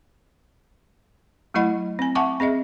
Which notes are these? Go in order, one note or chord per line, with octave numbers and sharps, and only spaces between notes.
F#3 A3 E4 D#5 F#5 B5
C4 G#5
E5 F#5 G#5 A5 C#6 D6
C4 G#4 D#5 E5